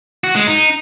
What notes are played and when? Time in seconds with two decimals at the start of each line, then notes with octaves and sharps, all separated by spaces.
0.24 F#4
0.35 G#3
0.47 D#4